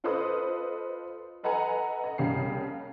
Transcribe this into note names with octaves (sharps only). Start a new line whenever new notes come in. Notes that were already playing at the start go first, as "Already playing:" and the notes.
F4 A4 B4 C5 D#5 D#6
A4 B4 D#5 F#5 G#5 A#5
D#5
C2 C#3 G4 C7